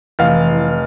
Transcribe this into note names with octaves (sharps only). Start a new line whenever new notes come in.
F1 E3 F5